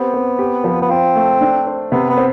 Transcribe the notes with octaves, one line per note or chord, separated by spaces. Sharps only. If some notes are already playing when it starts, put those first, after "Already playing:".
Already playing: B3 C4 G4
C4
G4
F3
B3
C4 F4
A3
D4
C5
C3 B3
B3
C4